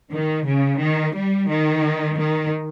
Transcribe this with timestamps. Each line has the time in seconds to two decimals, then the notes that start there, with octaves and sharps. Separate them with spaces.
0.11 D#3
0.46 C#3
0.79 D#3
1.13 G3
1.48 D#3
2.18 D#3